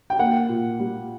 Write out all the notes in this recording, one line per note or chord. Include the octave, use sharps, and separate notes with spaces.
G5
A#3 F#5
A#2
G3